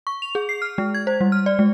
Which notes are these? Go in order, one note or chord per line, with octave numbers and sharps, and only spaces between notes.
C#6
F7
G#4
C7
F6
G#3
G#6
C5
G3
F6
D5
G#3